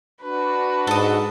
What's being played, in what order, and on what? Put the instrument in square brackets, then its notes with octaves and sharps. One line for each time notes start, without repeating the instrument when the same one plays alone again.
[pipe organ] D4 F#4 [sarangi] B4
[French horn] G#2 [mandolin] A4 D#5